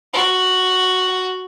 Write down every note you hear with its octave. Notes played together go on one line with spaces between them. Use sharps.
F#4